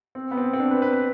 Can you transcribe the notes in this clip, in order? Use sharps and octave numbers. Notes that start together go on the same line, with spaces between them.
C4
B3
C4
C4
D4
B4
B4
B4